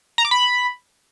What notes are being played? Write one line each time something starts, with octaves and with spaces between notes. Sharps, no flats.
A#5
D6
B5